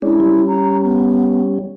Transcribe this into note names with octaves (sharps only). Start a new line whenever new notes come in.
G#3 C#4 D4 E4
G3 C#4
A#5
B3